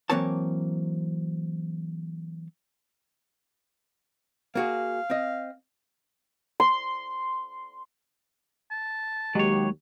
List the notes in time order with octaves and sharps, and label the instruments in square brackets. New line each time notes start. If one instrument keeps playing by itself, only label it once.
[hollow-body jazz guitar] E3 F#3 A#3 C4 C#5 A5
[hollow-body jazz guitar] A#3 F#4 G#4 [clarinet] F5
[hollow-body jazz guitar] C4 D#5
[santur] C6
[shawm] A5
[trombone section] D#2 G4 [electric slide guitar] F#3 C#5 [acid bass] G#3